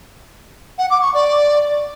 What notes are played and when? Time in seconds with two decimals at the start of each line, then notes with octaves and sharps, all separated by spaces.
0.78 F#5
0.90 D6
1.02 C#6
1.14 D5